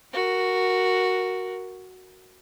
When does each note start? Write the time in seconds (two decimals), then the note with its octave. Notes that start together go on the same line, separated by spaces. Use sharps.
0.13 F#4 A#4